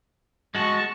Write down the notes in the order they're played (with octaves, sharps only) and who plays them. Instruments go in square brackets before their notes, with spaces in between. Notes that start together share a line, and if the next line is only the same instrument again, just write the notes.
[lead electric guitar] G#3 F#4 [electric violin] A5 C#6